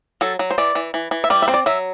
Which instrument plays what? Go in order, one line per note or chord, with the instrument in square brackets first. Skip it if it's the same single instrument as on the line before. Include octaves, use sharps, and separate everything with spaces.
[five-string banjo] F#3 A4
F#3
C5
E3 D5
E3
E3
E3
E5
G3 D5
E5
C4 C5
D5
F#3 E5